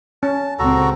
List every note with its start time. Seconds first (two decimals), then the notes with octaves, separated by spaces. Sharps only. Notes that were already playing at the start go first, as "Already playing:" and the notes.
0.23 C#4 A5
0.59 C#2 A#2 C4 F#4 A4 A#5